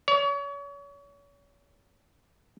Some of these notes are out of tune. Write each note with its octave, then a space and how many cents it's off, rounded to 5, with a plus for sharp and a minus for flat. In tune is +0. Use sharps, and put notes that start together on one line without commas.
C#5 +35